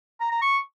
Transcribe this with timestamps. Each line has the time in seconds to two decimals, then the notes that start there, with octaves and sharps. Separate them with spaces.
0.20 A#5
0.31 A#5
0.41 C#6